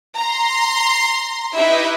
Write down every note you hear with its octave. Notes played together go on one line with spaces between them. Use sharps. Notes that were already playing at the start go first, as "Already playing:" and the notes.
A#5 C6
D#4 E4 G4 B4 D#5 E5